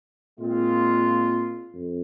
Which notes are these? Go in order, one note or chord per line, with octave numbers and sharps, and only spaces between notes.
A#2 G#3 C4 F4
F2